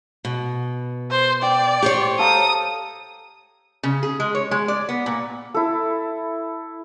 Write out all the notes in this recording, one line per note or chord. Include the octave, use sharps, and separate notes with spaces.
B2
C5
D5 G5
G4 C5 C#5
A4 F5 A#5 D#6
C#3
G#4
G#3
C#5
G#3
D5
B3
A#2
E4 A4